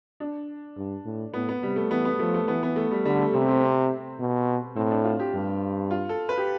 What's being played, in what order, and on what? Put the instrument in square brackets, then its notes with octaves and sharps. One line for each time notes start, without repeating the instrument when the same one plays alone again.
[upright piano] D4
[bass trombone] G2
A2
[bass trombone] A2 [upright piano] B3
[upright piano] B3
[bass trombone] C3 [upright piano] G3
[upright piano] A3
[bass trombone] E3 [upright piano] B3
[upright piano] B3
[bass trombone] F3 [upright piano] A3
[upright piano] A3
[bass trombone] E3 [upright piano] B3
[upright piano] B3
A3
G3
[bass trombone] D3 [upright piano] G3
[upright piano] A3
[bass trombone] C3 [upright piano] C4
[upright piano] C4
C4
[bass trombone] B2
[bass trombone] A2 [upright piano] C4
[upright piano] D4
F4
G4
[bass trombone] G2
[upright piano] F4
A4
B4
G4